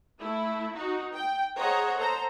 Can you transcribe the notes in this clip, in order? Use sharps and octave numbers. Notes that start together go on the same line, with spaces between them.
A3 E4
D#4 F#4
G5
G#4 C5 C#5 D#5 F#5 A#5
A4 C5 A#5